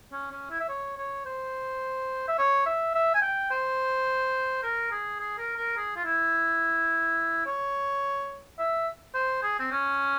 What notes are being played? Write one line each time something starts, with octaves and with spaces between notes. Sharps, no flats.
C#4
C#4
E4
E5
C#5
C#5
C5
E5
C#5
E5
E5
G#5
G5
C5
A#4
G#4
G#4
A#4
A#4
G#4
F4
E4
C#5
E5
C5
G#4
C4
C#4